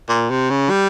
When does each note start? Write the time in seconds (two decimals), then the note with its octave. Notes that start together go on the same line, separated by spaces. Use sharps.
0.09 A#2
0.30 C3
0.50 C#3
0.70 G3